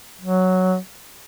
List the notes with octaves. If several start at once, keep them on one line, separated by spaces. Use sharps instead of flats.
F#3